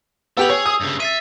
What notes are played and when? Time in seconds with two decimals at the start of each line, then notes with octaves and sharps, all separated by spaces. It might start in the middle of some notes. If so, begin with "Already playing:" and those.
0.37 B3 G4 A4 B5 E6 F7
0.49 G#4 C#5
0.66 D#6
0.81 G2 C#3
1.00 E5 A6 C7 D#7